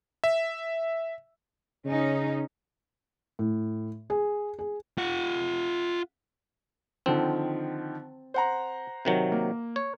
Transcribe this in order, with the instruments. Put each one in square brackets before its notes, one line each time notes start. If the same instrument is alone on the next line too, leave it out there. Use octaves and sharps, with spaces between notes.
[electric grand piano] E5
[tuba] C#3 [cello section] C#4 D#4
[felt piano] A2
G#4
G#4
[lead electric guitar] F4 F#5
[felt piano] D3 D#3 F3 [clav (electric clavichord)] C4
[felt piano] C5 F#5 A#5
[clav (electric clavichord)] C3 D#3 F#3
[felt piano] A#3
[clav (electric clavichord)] C#5